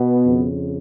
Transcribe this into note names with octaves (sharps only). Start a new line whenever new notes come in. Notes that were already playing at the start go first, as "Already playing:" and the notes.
Already playing: B2 B3
F2 C#3